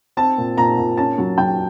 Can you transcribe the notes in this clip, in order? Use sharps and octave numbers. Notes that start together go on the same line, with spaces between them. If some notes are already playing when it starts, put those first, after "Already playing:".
C4 A5
A#2
A#2 A#5
A#2
C#4 A5
F#3
F#3 G5